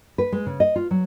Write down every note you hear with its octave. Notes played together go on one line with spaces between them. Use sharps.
B4
G#3
C#3
D#5
F4
F#3